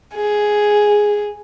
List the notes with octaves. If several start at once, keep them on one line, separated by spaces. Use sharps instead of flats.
G#4